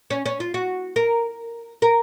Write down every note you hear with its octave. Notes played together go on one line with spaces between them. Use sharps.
C#4
C#4
F4
F#4
A#4
A#4